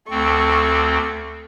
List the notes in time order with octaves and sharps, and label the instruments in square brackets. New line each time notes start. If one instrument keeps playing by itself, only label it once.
[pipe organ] D2 C4 [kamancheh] A4 C#6